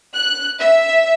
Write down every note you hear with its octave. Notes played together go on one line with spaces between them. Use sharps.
F#6
E5